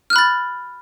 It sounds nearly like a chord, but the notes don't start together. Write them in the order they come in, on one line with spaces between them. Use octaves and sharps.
F6 F#6 B5 A6